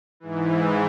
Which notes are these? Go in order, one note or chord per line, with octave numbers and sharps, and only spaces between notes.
G#2 E3